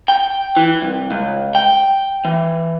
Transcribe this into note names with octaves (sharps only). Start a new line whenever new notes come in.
G5
E3
C2
C#2
G5
E3